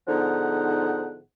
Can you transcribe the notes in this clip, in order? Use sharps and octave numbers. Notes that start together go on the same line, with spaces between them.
G#2 D3 F3 B3 D#4 F#5